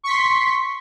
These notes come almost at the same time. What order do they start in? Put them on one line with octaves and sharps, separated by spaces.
C#6 B6 C6